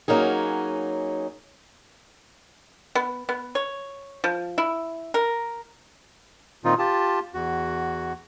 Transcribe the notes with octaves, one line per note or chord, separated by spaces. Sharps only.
F#3 A#3 C#4 D#4 G#4
B3
B3
C#5
F3
E4
A#4
A#2 D#3 C4 D#4 F4
F4 G4 A5
E2 F#4